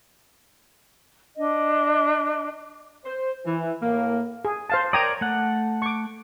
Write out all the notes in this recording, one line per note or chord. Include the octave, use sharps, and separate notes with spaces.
D4 D#5
C5
E3
A2 A#3
G#4
C5 F5 A5
A#4 C#5 D5 G5 A#5 D#6
A3 F#5
C#6 D6